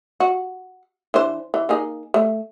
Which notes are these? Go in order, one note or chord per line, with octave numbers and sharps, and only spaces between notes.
F#4
E3 D4 C5
E3
A#3 D#4 G#4
A3